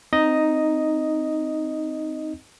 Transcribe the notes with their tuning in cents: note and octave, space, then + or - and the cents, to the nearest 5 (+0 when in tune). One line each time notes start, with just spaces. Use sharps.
C4 +0 D#4 +0 D#5 +0